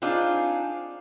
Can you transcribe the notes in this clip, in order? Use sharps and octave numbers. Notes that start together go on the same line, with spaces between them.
C4 D4 D#4 F4 G#4